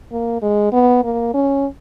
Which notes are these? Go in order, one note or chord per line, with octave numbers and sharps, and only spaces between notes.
A#3
G#3
B3
A#3
C#4